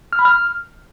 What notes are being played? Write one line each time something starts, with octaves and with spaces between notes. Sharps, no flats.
F6
B5
F6